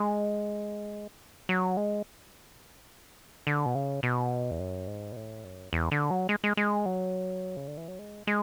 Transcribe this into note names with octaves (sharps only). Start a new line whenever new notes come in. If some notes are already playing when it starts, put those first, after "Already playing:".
Already playing: G#3
F#3
G#3
D3
B2
C#3
B2
E2
F#2
G#2
B2
A2
F#2
E2
D3
F#3
G#3
G#3
G#3
F#3
C#3
D3
E3
F#3
G#3
G#3